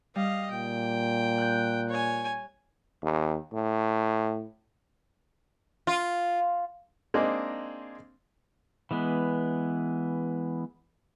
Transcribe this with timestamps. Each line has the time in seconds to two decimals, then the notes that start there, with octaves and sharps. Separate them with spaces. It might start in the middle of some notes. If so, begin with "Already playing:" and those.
0.15 G3 D#5 F5
0.51 A#2 G5
1.38 F#6 G6
1.89 C#5 G#5
3.03 D#2
3.53 A2
5.87 F4
7.14 G#3 A#3 C4 D4 D#4 G#4
8.91 E3 G#3 B3